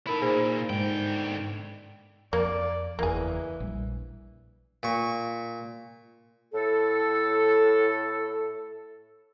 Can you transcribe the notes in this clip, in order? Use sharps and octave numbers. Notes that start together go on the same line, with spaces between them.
D#4 E4 A4 A#4 B5
A#2 G#4 C5 G#5
G#2 D3 G5
F2 A#3 D5
F#1 E2 E3 A#3 G#4
A#1 G3
A#2 C#6
A2 A4